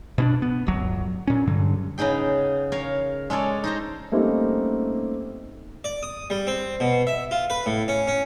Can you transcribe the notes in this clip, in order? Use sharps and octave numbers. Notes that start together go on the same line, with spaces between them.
B2 C#4 D4
B3
D1 G1 F#3
A#2 C#4
G2 D3 F#3
C#3 B3 D#4 G#4 G5
A#4 C#5 F5
G#3 C#4 A4 C#5 D5
D#4 C5 A#5
G3 A3 A#3 C4 C#4 D#4
D5
D#6
G3
C4
B2
E5
F4
B4
A2
C#4
C#4